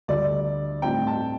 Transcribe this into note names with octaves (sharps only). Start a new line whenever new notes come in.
D2 D3 G3 D5
A2 G3 C4 G5
A5